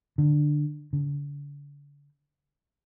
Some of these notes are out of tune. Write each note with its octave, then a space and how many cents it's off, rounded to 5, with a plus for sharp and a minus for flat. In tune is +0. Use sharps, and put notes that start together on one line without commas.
D3 +15
D3 -40